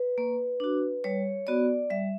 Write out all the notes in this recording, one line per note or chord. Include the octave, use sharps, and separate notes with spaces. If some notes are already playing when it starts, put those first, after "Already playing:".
Already playing: B4
A#3
D4 F#4
G3 C#5
B3 F#4 D5
G3 E5